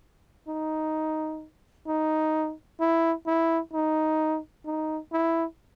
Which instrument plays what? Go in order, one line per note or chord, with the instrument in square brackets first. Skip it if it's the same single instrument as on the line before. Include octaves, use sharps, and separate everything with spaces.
[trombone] D#4
D#4
E4
E4
D#4
D#4
E4